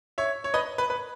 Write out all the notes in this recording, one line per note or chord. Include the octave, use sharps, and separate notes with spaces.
C#5 E5
C#5
B4 D#5
B4
B4